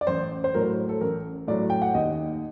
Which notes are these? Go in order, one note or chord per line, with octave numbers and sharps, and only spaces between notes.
D5
A1 C5
C5
A2 F#3 A#4
A4
A1 A#4
A2 F#3 D5
G5
F#5
D#2 D#5